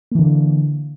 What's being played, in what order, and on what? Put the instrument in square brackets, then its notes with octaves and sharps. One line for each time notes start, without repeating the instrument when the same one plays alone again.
[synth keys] A#3
E3
D3